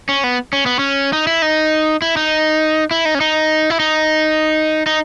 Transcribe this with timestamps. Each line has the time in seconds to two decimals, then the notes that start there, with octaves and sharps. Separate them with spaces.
0.09 C#4
0.24 B3
0.53 C#4
0.66 B3
0.79 C#4
1.13 D#4
1.27 E4
1.42 D#4
2.02 E4
2.17 D#4
2.91 E4
3.05 D#4
3.15 C#4
3.21 D#4
3.70 E4
3.80 D#4
4.86 D#4